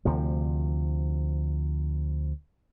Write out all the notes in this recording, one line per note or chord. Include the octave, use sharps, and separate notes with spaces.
D2 C3 F3